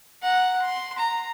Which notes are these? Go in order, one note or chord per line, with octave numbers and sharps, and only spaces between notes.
F#5 A#5
C6
A#5